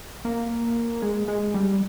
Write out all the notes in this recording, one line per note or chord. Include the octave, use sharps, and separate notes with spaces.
A#3
G#3
G#3
G3